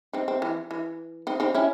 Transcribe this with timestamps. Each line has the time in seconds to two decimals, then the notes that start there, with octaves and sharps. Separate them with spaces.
0.13 C4 D#4
0.28 C4
0.42 E3
0.71 E3
1.27 C4 D#4
1.40 C4 D#4
1.55 C#4 E4